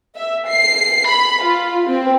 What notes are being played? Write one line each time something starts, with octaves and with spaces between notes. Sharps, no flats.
E5
C7
B5
F4
C4